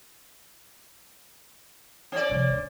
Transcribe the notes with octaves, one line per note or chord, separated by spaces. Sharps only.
C4 D5
C3 F3
C#4 D4